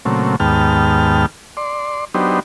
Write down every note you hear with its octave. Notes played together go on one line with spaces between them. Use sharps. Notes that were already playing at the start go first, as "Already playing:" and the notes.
A#2 C#3 F#3 A3 C4
D#2 G#2 B3 G5 A5 F6
D5 C6
F#3 B3 D4 D#4 G4 C5